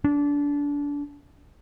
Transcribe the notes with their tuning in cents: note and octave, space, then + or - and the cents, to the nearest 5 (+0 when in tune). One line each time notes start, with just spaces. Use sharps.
D4 -25